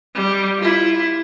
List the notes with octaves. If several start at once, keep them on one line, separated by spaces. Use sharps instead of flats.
G3
E4 F4